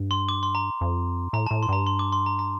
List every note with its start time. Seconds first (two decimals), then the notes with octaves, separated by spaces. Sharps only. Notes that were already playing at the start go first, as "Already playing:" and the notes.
Already playing: G2
0.11 C6
0.29 D6
0.43 C6
0.55 A#5
0.81 F2
1.33 A2 A#5
1.46 A5
1.51 A2
1.63 C6
1.68 G2 A#5
1.86 C6
1.99 D6
2.12 C6
2.26 A#5
2.39 A#5